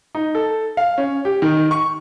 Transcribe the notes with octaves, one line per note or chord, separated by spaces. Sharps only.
D#4
A4
F5
C#4
G4
D#3
C#6